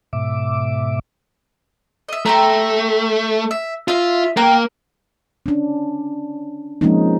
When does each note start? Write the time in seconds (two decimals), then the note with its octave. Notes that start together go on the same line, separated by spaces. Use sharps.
0.13 G#2 B2 E5 D6
2.09 D#5 E5
2.26 A3 G4 C5 A#5
3.51 E5
3.88 F4 D#5 E5
4.37 A#3 A#4 G5 F#6
5.46 C#4 D4
6.81 F3 G#3 A#3 C4 C#4 D#4